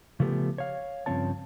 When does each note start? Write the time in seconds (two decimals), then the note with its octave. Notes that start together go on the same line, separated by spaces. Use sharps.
0.20 C#3 F3 A3 B3 G4
0.58 C#5 F5
1.06 G2 C#3 F3 C4 C#5 A5